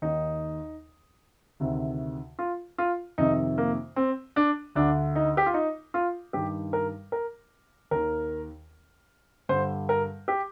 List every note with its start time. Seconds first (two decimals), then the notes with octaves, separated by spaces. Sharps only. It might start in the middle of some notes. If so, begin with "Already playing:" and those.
0.02 D#2 D#3 D#4
1.60 D2 C3 D#3
2.39 F4
2.78 F4
3.18 F2 C3 D#3 D#4
3.58 A#3
3.96 C4
4.36 D4
4.75 D2 D3 D4
5.16 D#4
5.37 G4
5.46 F4
5.54 D#4
5.94 F4
6.33 G2 D#3 G4
6.73 A#4
7.12 A#4
7.91 D#2 D#3 A#4
9.49 G2 D3 C5
9.89 A#4
10.28 G4